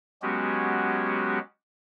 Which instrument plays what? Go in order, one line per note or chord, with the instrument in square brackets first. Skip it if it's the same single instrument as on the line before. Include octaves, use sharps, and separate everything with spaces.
[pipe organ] F#3 G#3 B3 C#4 F#4 G4